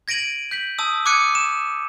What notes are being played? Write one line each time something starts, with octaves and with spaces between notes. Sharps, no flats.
G#6 A#6 D7 D#7 F#7
G6 B6 F#7
A5 D#6 E6
D6 D#6 F#6 G#6 C#7 D#7
E7